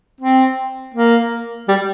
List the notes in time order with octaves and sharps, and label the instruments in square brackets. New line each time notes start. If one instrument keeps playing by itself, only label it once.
[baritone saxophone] C4
A#3
G3